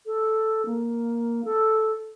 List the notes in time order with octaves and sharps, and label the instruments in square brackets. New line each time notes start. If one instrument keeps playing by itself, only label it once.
[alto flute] A4
A#3
A4